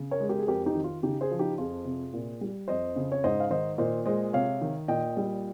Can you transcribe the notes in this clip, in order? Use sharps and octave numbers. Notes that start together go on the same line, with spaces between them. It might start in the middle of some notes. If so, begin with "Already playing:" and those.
Already playing: C#3
A#4 C#5
G#3
G4 A#4
G#4
F2 G4 A#4
D#4 G4
D#3
F4
C#3 D#4 G4
G#4 C5
F3
D#4 G4
F2 F4 G#4
C3
A#2
G3
F2 C5 D#5
C#3
C#5
G#2 C5 D#5
F5
D#3 C5 D#5
A#2 C5 D#5
G#3 C5 D#5
C3 C#5 F5
D#3
A#2 D#5 G5
G3